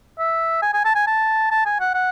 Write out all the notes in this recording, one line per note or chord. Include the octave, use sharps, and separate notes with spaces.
E5
G#5
G#5
A5
G#5
A5
A5
G#5
F#5
F#5